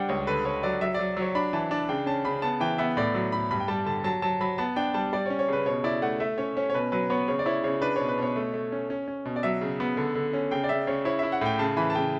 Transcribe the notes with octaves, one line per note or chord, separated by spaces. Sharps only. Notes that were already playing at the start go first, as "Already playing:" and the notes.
Already playing: G3 D4 F#5 G5
C#2 C#5
D3 B4
D3 C#5
F#3 D5
F#3 E5
F#3 D5
F#3 C#5
D4 B5
E3 A5
D4 A5
C#3 G5
C#4 A5
C#3 B5
B3 A5
E3 G5
B3 E5
A2 D5
F#3
A2 B5
G2 B5
G5
G3 A5
D3 A5
F#3 A5
F#3 A5
F#3 B5
B3 A5
D4 G5
G3 A5
G3 D5
C#5
C#4
C#5
C#3 B4
B2 C#5
E4 D5
A3 F#5
A3 E5
C#4 C#5
C#4 C#5
C#5
B2 B4
F#3 B4
B3 C#5
C#3 C#5
D5
E4 C#5
C#3 C#5
D4 B4
B2 C#5
B4
B2 C#5
A3
A3
C#4
C#4
C#4
B2
D5
F#3 E5
C#3
B3
D3
D3
C#4
C#3 G5
D5
C#3 E5
C#3 C#5
E4 C#5
E4 E5
F#5
A2 G5
C#3 A5
E3 B5
A5
C#3 G5